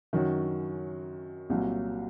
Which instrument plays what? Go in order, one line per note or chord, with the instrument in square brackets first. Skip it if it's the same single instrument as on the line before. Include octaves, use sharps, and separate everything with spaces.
[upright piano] F#2 D#3 F#3 C#4 F#4
C2 A#2 F#3